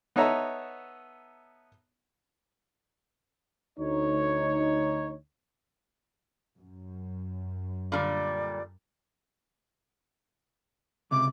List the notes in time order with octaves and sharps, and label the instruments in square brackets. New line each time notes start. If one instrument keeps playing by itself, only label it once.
[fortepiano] B3 D#4 A4 C#5 E5 A#5
[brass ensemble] D2 D#4 C#5
[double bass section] F#2
[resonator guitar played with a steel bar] A#2 D3 G3 [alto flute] D5
[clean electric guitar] C#2 C3 [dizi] D6